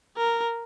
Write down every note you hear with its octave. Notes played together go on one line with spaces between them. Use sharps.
A#4